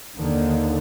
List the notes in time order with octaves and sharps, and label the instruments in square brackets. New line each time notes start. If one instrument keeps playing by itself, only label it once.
[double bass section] D#2 D3 D#3